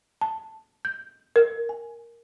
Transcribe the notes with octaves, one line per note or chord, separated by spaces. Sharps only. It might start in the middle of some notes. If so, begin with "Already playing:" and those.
A5
G6
A#4
G#5